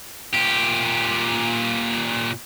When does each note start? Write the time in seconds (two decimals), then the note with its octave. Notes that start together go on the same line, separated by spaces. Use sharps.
0.34 A#2 G4